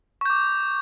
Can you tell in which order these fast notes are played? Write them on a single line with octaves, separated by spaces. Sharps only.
C#6 G6 D6